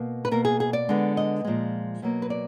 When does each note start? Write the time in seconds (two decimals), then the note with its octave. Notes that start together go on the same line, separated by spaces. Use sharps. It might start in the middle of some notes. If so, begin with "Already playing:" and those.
Already playing: B2 A#3
0.25 B4
0.31 B2 A#3 A#4
0.45 G#4
0.60 G#4
0.73 D5
0.89 D3 G#3 B3
1.17 D#5
1.45 A#2 F3 G#3
2.02 B2 F#3 A#3
2.22 B4
2.30 D5